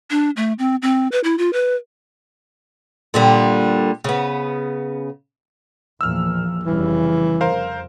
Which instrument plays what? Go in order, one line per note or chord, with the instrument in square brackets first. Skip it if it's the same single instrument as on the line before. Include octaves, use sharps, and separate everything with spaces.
[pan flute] D4
A3
C4
C4
B4
E4
F4
B4
[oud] A#2 D3 G3
C#3 B3
[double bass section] E2 A#2 F3 [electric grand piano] E6 F6
[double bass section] F1 C#3 G3 [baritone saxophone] E3
[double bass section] F2 [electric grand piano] A#4 C5 F5